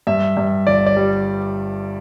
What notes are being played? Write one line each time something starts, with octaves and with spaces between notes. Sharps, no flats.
G2 E5
G2
G1 D5
D5
G3